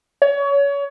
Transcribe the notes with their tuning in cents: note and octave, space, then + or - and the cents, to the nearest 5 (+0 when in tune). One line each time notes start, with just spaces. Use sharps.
C#5 +30